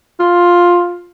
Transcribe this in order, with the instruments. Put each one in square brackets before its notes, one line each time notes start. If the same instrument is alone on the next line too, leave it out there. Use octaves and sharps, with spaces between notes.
[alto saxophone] F4